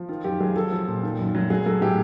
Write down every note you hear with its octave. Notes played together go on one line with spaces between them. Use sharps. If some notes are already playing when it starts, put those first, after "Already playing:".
Already playing: F3
D#3 F4
F#2 G4
F#3 G#4
F3 A4
F3
A#2
D#3
F#2
F#3
F#3 G#4
F#3 A4
A2 G4